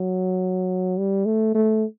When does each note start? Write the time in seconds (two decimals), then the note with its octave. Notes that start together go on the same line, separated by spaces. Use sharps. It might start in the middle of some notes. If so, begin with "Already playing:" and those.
Already playing: F#3
0.98 G3
1.25 A3
1.55 A3